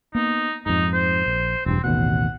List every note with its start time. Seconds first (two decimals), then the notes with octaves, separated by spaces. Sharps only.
0.15 A#3 B3 D#4
0.66 F2 G#2 D#4
0.93 C5
1.26 A#1
1.66 E1 G2 C4
1.84 A1 D#2 B2 F#5